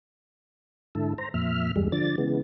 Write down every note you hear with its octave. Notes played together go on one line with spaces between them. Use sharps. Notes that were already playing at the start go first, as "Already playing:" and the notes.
G#2 D3 E4 A4
C5 A#5
F2 A#2 E5 F6
E2 G2 G3 G#3
D3 F3 D5 A6
C#3 E3 G#3 B3